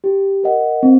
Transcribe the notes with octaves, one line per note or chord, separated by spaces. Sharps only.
G4
A#4 D#5 F#5
C4